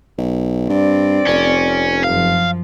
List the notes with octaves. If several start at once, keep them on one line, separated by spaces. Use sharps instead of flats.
B1
G2 C4 D5
F1 C#4
F#2 F3 F5